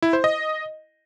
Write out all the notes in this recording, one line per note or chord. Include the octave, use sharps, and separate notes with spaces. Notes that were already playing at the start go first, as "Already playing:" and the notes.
E4
C5
D#5